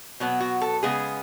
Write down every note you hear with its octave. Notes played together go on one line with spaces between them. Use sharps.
B2 F#3 B3
F#4
A4
C#3 G#3 B3 G#4